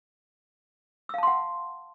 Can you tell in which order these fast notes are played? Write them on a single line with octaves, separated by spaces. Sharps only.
E6 F5 A5 C6 F#5